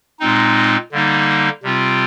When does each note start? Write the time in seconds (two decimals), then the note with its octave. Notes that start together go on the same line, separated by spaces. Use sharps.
0.20 A#2 G#3 C4 D#4
0.92 D3 G3 A#3 D#4
1.63 C3 G3 C4 F4